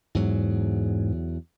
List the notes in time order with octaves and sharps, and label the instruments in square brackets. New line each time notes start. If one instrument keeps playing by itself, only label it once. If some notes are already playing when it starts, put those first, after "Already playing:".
[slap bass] E2 F#3 [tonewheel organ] G#2